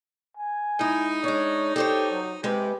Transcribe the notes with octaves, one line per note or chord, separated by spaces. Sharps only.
G#5
G#3 D#4 E4
G#3 D4 C#5
G4 A4 C5 C#5
F#3
C3 G#3 G4 B4